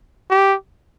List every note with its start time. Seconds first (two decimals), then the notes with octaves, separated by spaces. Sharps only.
0.31 G4